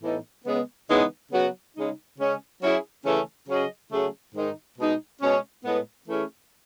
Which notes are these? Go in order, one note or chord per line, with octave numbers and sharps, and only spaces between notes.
A2 E3 B3 D#4 A4
C#3 G#3 B3
C#3 E3 G#3 B3 D#4
C#3 F#3 B3 F#4
C#3 G#3 D#4
C#3 G#3 C#4
F#3 C#4 E4 G#4
C#3 E3 A3 C#4
C#3 F#3 C#4 G#4 D#5
C#3 F#3 A3 C#4 G#4
G#2 D#3 G#3 D#4
B2 G#3 D#4
B2 G#3 C#4
A2 G#3 B3
E3 A3 C#4 E4 G#4